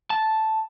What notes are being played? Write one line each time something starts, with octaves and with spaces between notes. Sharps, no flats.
A5